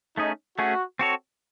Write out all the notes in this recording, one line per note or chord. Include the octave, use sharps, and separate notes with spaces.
A3 C#4 D#4 G#4
A3 C#4 F#4 G#4
C4 F#4 A4 C#5